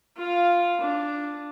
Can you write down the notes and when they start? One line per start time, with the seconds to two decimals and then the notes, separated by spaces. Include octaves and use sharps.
0.17 F4 F5
0.81 D4